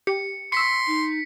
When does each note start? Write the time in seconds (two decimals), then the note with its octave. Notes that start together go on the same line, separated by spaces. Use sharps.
0.07 G4 C#7
0.52 C6 C#6 E6 B6 C#7
0.87 D#4